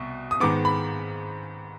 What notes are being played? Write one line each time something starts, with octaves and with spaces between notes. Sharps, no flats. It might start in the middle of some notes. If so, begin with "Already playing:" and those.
Already playing: C2 B2
D#6
G#2 D#3 G#3 B3 D6
B5